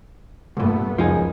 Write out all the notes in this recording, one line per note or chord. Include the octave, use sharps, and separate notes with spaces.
C2 G2 A#2 A3 B3
C#2 F#2 F3 D#4 G#4